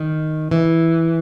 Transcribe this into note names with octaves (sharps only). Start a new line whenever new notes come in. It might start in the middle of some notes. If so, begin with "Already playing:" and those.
Already playing: D#3
E3